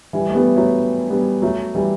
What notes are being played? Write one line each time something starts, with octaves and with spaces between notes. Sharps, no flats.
E3 G3
A3
G3 B3
F#3 A3
G3 B3
F#3 A3
E3 G3